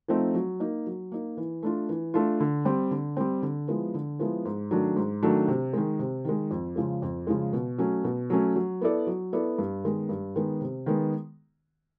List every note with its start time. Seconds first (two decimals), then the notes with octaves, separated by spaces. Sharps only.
0.08 F3 A3 C4 D#4
0.34 F#3
0.60 A#3 D#4
0.86 F#3
1.12 A#3 D#4
1.37 E3
1.63 A3 D4 F4
1.89 E3
2.14 A3 D4 F4
2.40 D3
2.65 G3 C4
2.91 D3
3.17 G3 C4
3.42 D3
3.67 F3 G#3 B3 E4
3.94 D3
4.19 F3 G#3 B3 E4
4.45 G#2
4.71 D#3 F#3 A3 D4
4.96 G#2
5.23 D#3 F#3 A3 D4
5.48 C3
5.73 D#3 G#3
5.99 C3
6.25 D#3 G#3
6.51 F2
6.76 C#3 F3 G#3
7.02 F2
7.27 C#3 F3 G#3
7.53 B2
7.78 F#3 A3 C#4
8.04 B2
8.30 F#3 A3 C#4
8.56 F#3
8.81 B3 E4 A4 D5
9.07 F#3
9.33 B3 E4 A4 D5
9.58 G2
9.84 D#3 G#3 B3
10.09 G2
10.36 D#3 G#3 B3
10.61 C3
10.86 D#3 G#3 B3